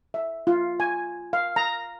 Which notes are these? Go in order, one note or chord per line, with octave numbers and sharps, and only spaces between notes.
E5
F4
G#5
F5
A#5